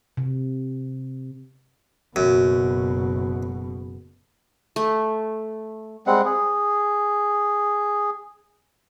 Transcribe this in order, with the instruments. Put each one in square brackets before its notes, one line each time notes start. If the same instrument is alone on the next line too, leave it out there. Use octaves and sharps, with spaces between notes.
[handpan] C3
[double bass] F#1 B2 [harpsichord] F#2
[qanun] A3
[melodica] G3 G#3 C4 F#5
G#4